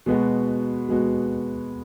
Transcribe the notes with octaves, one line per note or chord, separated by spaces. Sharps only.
B2 G#3 B3 F#4
B2 G#3 B3 F#4